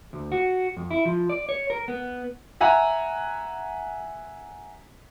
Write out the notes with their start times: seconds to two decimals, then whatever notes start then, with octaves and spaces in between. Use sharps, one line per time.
0.13 D2
0.32 F#4
0.77 F2
0.91 E4
1.05 F3
1.29 D5
1.49 C#5
1.70 A#4
1.88 B3
2.61 E5 F#5 G#5 A#5